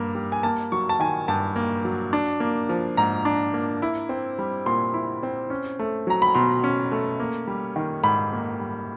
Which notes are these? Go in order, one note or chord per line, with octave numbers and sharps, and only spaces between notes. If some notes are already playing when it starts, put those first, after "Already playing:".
Already playing: G2 A#3
G3
G#5
A#3 A5
F#3 C#6
A5
D#3 G#5
G2 A5
A#3
F#3
D4
A#3
F3
G#2 A#5
D4
A#3
E4
C4
G3
A#2 C6
E4
C4
C#4
A3
F#3 A#5
B5
B2 C6
C#4
A3
A#3
G3
D#3
G#2 B5
A#3
G3